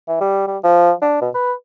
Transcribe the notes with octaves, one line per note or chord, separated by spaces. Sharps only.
E3
G3
G3
F3
D4
B2
B4